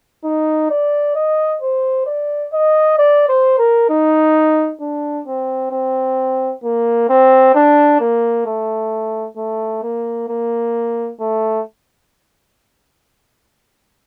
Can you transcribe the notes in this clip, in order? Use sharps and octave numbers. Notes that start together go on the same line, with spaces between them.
D#4
D5
D#5
C5
D5
D#5
D5
C5
A#4
D#4
D4
C4
C4
A#3
C4
D4
A#3
A3
A3
A#3
A#3
A3